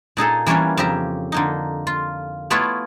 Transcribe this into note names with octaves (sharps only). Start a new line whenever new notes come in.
A#2 D#4 G#4 A4
E3 G3 A#3 C#4 D4 C#5
F2 C#3 G4 E5 A#5
D3 A#3 D#4
F4
A3 B3 E4 F4 B4 C#5